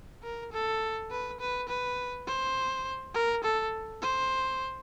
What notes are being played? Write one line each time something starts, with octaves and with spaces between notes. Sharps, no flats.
A#4
A4
B4
B4
B4
C5
A#4
A4
C5